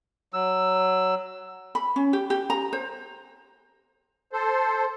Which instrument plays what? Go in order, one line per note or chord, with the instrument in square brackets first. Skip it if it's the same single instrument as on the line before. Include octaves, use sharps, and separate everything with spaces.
[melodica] F#3 E6
[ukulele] B5
C#4
G4
G4
A#5
C5
[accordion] A4 C5